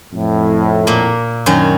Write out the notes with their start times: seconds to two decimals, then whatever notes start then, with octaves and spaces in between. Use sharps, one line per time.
0.13 F2 A2
0.87 A#2 A#3
1.46 F#2 D#3 C#4